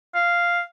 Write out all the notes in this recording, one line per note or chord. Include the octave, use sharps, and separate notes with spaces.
F5